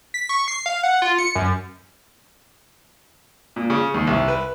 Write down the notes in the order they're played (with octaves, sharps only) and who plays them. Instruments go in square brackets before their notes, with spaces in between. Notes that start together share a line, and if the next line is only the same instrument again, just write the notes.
[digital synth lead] B6
C#6
C7
F5
F#5
F4
C#7
F#2
[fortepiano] A#2
C#3
D#2
C2
B4